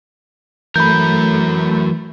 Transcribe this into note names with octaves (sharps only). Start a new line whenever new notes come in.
E3 F#3 A3 A#4 B5 G6